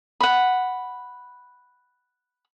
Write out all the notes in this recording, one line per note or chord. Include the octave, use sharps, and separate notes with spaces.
F#5 B5